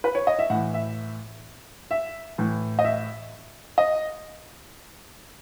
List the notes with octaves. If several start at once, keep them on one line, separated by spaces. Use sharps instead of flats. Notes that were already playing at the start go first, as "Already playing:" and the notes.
B4
C#5
D#5
E5
A2 E3 F#5
E5
E5
A2 E3
D#5
E5
D#5